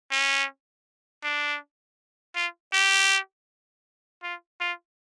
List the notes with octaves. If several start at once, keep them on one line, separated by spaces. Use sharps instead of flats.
C#4
D4
F4
G4
F4
F4